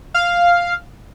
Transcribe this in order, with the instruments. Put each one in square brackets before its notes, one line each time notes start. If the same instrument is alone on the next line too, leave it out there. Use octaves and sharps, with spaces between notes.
[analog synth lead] F5